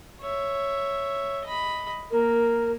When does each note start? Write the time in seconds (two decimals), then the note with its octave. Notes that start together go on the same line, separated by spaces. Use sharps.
0.20 C#5 E5
1.44 D#5 B5
2.11 A#3 A#4